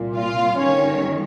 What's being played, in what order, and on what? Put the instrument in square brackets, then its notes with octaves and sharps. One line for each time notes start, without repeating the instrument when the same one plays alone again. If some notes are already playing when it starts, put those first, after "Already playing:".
Already playing: [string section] C2 A#2
F4 F5
G1 G2 D#3 C#4 C#5